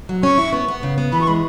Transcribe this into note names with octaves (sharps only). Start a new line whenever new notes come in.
F#3
C#4 C#6
E4
B3
B3
C#3
B3
E3 B5
C#6
G#3 B5